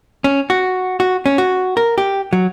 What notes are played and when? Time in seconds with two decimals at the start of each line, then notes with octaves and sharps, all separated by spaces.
0.24 C#4
0.50 F#4
1.00 F#4
1.26 C#4
1.38 F#4
1.77 A#4
1.98 G4
2.33 F#3